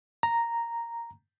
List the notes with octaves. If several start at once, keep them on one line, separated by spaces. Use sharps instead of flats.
A#5